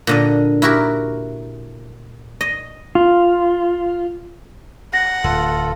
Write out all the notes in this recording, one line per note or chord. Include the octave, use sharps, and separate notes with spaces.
A#2 D3 D#5
E4 F#4 G4 A#4
D#5
F4
F#5 A#6
D1 F4 A4